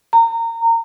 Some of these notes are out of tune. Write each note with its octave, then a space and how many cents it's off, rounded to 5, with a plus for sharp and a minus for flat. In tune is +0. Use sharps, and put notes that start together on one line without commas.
A#5 -25